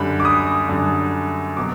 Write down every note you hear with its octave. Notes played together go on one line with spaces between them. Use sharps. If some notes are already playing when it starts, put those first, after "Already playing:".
Already playing: F#2 D3 G3 B5
D6
D#6
F#2 D3 G3
B2 F#3 D6